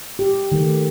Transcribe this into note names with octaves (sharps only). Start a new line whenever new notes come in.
G4
D#3 A3